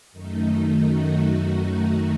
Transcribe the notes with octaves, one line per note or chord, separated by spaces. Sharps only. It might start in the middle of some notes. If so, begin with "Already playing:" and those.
F#2 D#3 A3 D#4
F#4
D#4